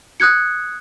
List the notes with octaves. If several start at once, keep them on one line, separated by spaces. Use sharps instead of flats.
D#6 F#6 G#6 C#7